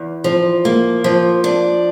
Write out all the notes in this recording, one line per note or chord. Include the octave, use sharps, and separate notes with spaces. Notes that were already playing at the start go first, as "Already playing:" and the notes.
Already playing: E2
F3
A#3
F3
D4